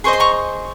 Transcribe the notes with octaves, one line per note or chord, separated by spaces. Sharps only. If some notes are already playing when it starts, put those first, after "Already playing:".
G#4 C5 D#5 C#6
C6
A#5 C#6